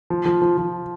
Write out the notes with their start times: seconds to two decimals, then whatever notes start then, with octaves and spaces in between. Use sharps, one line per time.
0.10 F3
0.26 F3
0.42 F3
0.58 F3